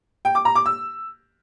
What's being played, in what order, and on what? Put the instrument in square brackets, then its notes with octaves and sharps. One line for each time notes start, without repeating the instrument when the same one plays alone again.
[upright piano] G5
D6
A#5
D6
E6